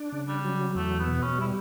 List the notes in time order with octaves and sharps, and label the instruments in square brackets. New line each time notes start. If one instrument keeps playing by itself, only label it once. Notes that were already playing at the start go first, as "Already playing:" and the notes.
Already playing: [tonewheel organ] D4
C#3
[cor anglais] G3
[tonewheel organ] F#3
[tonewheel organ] E2 [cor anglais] A3
[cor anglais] B3
[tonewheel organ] B2
[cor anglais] C#4
[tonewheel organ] G3 [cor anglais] E4